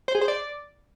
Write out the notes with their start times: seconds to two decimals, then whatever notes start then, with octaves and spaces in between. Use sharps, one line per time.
0.08 C5
0.15 G#4
0.21 C5
0.28 D5